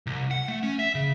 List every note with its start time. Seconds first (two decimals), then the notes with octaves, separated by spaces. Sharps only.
0.07 C2
0.31 F#5
0.48 A3
0.63 C#4
0.79 E5
0.95 C#3